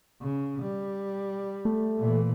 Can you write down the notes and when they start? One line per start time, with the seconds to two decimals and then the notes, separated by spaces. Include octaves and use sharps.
0.21 C#3
0.62 G3
1.65 A3
1.99 A#2 E3